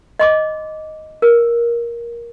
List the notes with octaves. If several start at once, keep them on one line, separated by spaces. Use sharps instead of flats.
D#5 C6 D6
A#4